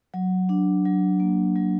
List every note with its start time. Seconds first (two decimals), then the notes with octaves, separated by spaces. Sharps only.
0.14 F#3
0.49 D4
0.85 F#3
1.20 A#3
1.56 F#3